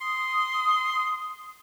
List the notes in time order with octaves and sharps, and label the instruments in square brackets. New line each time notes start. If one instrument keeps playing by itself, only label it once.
[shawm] C6 [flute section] D#6